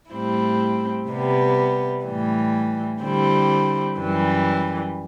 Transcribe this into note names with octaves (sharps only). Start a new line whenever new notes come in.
A2 G3 C4 E4
C3 G3 B3
A2 E3 G3
D3 G3 C4 E4
F#2 E3 G3